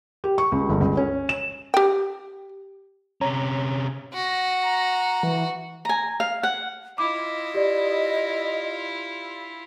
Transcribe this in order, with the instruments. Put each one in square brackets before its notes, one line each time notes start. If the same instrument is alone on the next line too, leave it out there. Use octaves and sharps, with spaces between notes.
[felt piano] G4
C#6
C#2
G1
C#2
C#4
E7
[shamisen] G4 G5
[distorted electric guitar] C3 C#4 [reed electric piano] C#5 A#5
[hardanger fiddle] F#4 [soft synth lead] A#6
[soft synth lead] A#5
E3
[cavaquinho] G#5 A#5
F5
F#5
[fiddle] E4 F4 [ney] D#5 [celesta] D6
[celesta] G4 D5